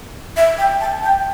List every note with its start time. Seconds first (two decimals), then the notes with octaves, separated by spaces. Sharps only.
0.37 E5
0.58 G5
0.81 A5
1.03 G5